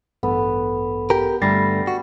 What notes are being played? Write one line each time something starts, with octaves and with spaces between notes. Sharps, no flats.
A1 G2 B3 A4
G4 A#4
G2 D3 G3 A3 A6 A#6 C7
F#4